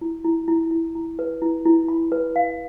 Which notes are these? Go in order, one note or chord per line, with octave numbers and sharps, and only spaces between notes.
E4
E4
E4
E4
E4
B4
E4
E4
B5
B4
F5